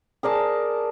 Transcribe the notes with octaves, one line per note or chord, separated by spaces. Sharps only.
G#4 A#4 D5 A5